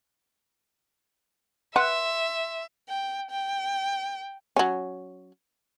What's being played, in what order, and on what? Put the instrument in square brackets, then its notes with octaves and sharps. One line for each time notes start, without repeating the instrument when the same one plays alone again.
[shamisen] B4 F#5 [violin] E5 [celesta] C6
[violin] G5
G5
[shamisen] F#3 C#4